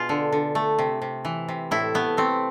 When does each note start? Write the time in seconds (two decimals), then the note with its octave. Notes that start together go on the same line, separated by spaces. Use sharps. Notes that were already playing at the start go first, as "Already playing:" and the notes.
Already playing: B2 F4 G#4
0.09 D3
0.32 D3
0.55 A3
0.78 C3
1.02 C3
1.25 E3
1.48 C3
1.71 A2 E4
1.94 A3 B3
2.17 A3 C4